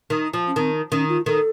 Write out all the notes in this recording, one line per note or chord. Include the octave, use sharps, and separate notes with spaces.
D#3
F3
C#4
D#3 C4
D#3 C#4
F4
D#3 A4